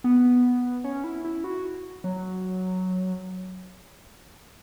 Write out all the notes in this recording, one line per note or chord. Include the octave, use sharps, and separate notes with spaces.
B3
C#4
E4
E4
F#4
F#3